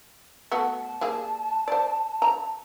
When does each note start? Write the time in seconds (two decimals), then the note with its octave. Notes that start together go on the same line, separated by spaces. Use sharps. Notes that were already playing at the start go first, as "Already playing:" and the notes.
0.52 A3 B3 F#4
0.76 A5
1.01 G3 A#3 G#4
1.68 C5 D5
2.22 A#5